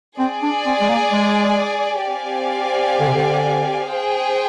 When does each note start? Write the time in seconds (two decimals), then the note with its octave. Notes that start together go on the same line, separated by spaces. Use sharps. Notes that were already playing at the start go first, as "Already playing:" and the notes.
0.19 C4 G#4 D5 G#5
0.43 D4
0.66 C4
0.81 G#3
0.90 A#3
1.12 G#3
2.06 C4 G4 D5 F5 G#5
3.00 D3
3.08 C3
3.15 D3
3.93 G#4 C5 G5